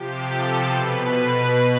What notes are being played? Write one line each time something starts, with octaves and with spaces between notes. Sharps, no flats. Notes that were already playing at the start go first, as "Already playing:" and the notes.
Already playing: C3 F3 G4
A4
B2 B4